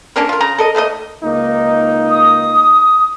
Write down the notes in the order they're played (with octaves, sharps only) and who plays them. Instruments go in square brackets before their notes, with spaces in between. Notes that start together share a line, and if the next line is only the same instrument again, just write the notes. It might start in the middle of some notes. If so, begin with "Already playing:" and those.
[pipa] A#3 C#4 D4 A#4
F4 A#4
C#3 A#5
A4 A#4 D#5
D#3 A3 A#3 D#5
[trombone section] C#2 A#3 D#4
[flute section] D#6